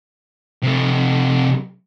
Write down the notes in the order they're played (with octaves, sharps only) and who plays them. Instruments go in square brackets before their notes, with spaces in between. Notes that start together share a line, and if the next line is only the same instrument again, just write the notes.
[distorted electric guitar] C3 A3